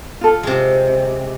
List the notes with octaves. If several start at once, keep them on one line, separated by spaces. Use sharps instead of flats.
F4 A4
C3 G#3